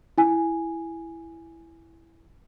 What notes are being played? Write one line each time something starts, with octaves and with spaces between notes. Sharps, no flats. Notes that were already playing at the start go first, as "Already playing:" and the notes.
E4 G#5